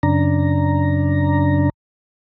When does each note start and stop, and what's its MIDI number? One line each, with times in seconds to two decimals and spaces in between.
0.03 1.70 42
0.03 1.70 49
0.03 1.70 62
0.03 1.70 82